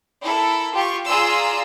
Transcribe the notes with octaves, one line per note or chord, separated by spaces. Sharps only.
E4 A4 A#4
F4 G4 C#6
F4 G#4 D5 A#5 C6 E6